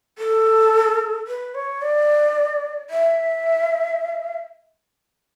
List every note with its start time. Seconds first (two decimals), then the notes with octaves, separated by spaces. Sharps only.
0.19 A4
1.27 B4
1.55 C#5
1.82 D5
2.90 E5